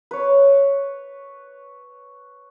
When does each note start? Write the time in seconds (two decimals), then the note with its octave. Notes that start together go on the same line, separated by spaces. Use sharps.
0.11 B4 C#5